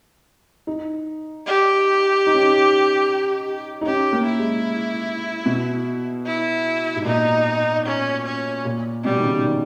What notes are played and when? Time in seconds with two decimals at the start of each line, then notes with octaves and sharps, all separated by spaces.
0.67 D#4
1.47 G4
2.27 D#4
2.34 C#4
2.41 D#4
3.81 D#4
3.86 C#4 G4
4.13 A#3
4.25 E4
4.39 G#3
5.46 B2
6.26 E4
6.96 G#2
7.05 A#2 D#4
7.86 C#4
8.25 C#4
8.65 A#2
9.04 B2 G3
9.19 D#3
9.25 C#3
9.45 D#3